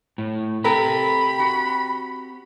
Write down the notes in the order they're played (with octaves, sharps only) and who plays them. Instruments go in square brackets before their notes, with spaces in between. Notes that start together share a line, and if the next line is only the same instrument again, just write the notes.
[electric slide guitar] A2
[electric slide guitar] C4 G4 [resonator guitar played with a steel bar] A4 A#4 [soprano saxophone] B5
[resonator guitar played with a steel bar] F#4